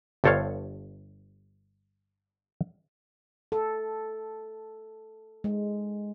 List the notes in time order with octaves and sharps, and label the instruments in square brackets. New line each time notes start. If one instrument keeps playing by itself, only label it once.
[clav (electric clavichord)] G1 G2 A4 C5 C#5 F5
[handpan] A4
G#3